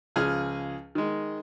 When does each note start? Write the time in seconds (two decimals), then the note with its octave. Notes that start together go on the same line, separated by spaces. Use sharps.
0.16 C#2 F3 G#4 G#5 F6
0.95 D#3 G#3